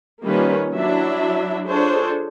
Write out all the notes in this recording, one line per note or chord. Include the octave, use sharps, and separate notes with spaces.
D#3 G3 A#3 C#4 F4 B4
F#3 D4 E4 E5
D4 F4 G#4 A4 C5 C#5